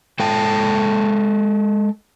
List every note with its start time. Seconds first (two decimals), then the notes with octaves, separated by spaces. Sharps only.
0.20 G#3 A4 G5 A5